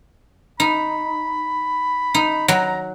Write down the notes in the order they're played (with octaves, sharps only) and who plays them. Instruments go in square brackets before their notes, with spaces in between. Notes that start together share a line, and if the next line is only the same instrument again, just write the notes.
[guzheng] D#4 [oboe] B5
[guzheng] D#4
[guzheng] F#3 [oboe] A#5